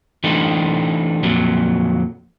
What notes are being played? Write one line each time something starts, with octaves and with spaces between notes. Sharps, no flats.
E3 A3 C4 D4 D#4
F2 A#2 F#3